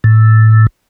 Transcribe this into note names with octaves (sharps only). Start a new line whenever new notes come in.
A2